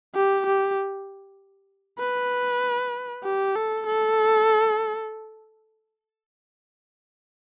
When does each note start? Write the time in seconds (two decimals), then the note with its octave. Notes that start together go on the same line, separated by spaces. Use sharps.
0.15 G4
0.46 G4
2.00 B4
3.24 G4
3.55 A4
3.86 A4